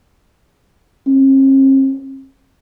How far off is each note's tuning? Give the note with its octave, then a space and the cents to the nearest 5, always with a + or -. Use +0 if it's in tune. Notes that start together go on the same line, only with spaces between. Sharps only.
C4 +45